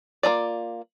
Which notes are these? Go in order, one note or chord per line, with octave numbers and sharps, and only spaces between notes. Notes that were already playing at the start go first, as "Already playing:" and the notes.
A#3 D#4 F4 D5